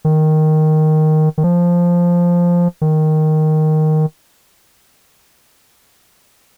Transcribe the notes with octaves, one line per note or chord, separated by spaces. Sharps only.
D#3
D#3
F3
D#3